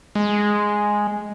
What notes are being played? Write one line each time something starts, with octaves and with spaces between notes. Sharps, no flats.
G#3